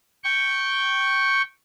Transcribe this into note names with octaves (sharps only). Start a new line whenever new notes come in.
G5 C#6